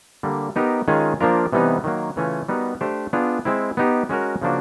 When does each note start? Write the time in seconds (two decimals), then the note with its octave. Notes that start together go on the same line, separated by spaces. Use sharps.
0.23 D3 G3 A#3
0.56 B3 D#4 G4 A#4
0.88 D#3 G#3 C#4 F4 G#4
1.20 F3 A#3 D4 F4 A#4
1.53 C3 E3 G3 B3 D#4
1.84 D#3 F#3 A#3
2.16 C#3 E3 A3 C#4 F4
2.49 G3 B3 D#4 F#4 A#4
2.81 A3 D4 G4 C5
3.13 B3 D4 F4 G#4
3.45 G#3 C4 E4
3.77 B3 D#4 G4
4.09 G#3 C#4 F#4 A#4
4.42 C#3 F3 A#3 D4 F#4